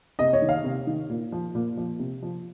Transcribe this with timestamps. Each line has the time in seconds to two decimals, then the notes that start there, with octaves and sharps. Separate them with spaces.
0.19 C3 D#5
0.33 C#5
0.42 D#3
0.49 F5
0.64 C3
0.87 D#3
1.09 A#2
1.32 F3
1.55 A#2
1.77 F3
1.99 C3
2.22 F3